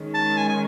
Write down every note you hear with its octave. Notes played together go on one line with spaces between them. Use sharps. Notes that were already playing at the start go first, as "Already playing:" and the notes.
Already playing: D#3 G#3 C#4
A5
G#5
G#5